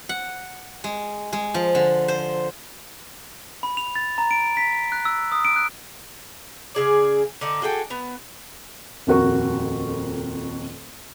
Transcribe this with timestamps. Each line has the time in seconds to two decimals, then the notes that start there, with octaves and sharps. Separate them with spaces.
0.09 F#5
0.84 G#3
1.33 G#3
1.54 F3
1.75 D3
2.08 C5
3.63 B5
3.77 F7
3.96 A6
4.18 A#5
4.31 D7
4.57 B6
4.92 F#6
5.05 E6
5.32 D#6
5.45 D7
5.56 F#6
6.75 C#3 G#4 D5
7.41 D3 D#4
7.62 F#4 G#4 A4 G5
7.90 B3
9.07 D#1 F2 F#4 A#4 C#6